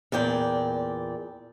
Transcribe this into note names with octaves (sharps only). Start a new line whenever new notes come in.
E2 A#2 D5 G5